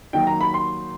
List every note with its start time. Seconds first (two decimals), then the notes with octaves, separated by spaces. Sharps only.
0.13 D#3 F#3 A#3 D#4 G5
0.27 A#5
0.41 B5
0.54 C6